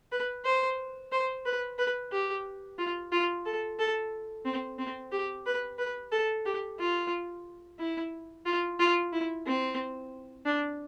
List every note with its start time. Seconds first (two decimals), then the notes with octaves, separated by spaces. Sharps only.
0.12 B4
0.45 C5
1.12 C5
1.46 B4
1.79 B4
2.12 G4
2.78 F4
3.12 F4
3.46 A4
3.79 A4
4.45 C4
4.79 C4
5.12 G4
5.46 B4
5.79 B4
6.12 A4
6.46 G4
6.79 F4
7.79 E4
8.46 F4
8.79 F4
9.13 E4
9.46 C4
10.45 D4